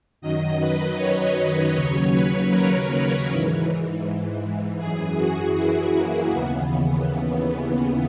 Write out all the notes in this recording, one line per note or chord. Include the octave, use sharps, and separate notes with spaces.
F#2 D#3 F#3 D#5
B4
C#5
C#5
D#2 C#3 F#3 C#5
B4
A#4
G#2 E3
F#2 E3 G#4
F#4
E4
A#3
D#2 C#3 E3 B3